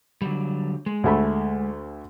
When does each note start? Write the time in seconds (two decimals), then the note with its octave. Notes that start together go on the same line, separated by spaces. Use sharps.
0.22 D3 F#3 G3
0.86 G#3
1.04 D2 A3 B5